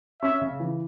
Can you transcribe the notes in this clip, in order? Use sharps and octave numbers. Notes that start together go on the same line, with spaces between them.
C#4 E5
C#3
E3